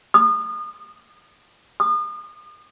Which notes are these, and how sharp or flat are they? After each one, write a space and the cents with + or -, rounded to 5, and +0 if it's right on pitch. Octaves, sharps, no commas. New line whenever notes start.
D#6 -35
D#6 -40